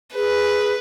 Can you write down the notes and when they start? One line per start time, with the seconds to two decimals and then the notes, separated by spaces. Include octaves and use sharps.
0.15 G#4 B4